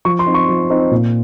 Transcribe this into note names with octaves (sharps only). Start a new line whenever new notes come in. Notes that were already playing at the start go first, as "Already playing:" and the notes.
F3 C#6
C6
C4 D#4
C#6
F3
C4 D#4
A#2